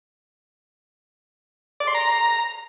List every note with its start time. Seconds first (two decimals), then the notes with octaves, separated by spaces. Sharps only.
1.80 D5
1.87 C6
1.94 A#5